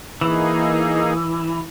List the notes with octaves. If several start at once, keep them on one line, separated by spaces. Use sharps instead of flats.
E3 A#3 D#4 G#4